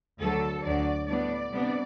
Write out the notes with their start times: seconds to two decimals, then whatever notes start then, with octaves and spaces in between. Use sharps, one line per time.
0.20 D2 D3 F#3 A4
0.64 D2 D3 F#3 D5
1.08 A2 G3 B3 D4 D5
1.51 C3 G3 B3 D4